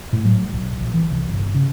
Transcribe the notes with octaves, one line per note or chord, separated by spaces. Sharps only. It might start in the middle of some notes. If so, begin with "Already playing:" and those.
A2
F#3
B1
A#1
E3
C2
G1
C#3